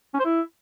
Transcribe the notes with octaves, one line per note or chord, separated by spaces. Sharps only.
C#4
C5
E4